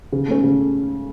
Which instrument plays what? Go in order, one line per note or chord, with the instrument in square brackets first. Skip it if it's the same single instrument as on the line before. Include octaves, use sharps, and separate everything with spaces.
[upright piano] C#3
A3 C#4
C#3